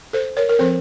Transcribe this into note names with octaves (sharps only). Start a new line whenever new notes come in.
A4 C5
A#4 C#5
A#4
F3 C4 A4 C5